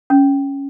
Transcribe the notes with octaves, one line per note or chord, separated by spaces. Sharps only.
C#4